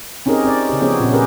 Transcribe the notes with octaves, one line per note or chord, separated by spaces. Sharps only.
C4 C#4 D#4 G4 G#4 A#4
C4 D5
C#3 G4
F3 B3 C#4 G#4
A#2 C4 C#4
C#4 G4 G#4 A#4 B4